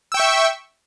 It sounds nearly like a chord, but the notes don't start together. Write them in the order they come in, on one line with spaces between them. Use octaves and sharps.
E6 G5 C#6 E5